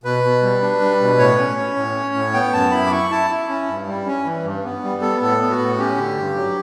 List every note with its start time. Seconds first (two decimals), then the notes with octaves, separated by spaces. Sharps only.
0.04 B2 B4
0.24 B2
0.42 G3
0.62 D4
0.81 G3
1.00 B2
1.18 A2 C#5
1.39 C#4
1.57 C#4
1.76 A2
1.95 C#4
2.14 A2
2.34 B3 G5
2.53 F#2 A5
2.72 E4 B5
2.86 D6
2.92 E4 C#6
3.11 E4 A5
3.30 E4
3.49 C#4
3.69 G2
3.87 G3
4.06 C#4
4.25 E3
4.44 G2
4.64 B3
4.83 G3
5.02 B3 A4
5.21 A2 A4
5.40 B3
5.50 F#4
5.60 A2
5.78 C#4 G4
5.97 D3
6.18 G2
6.35 F#3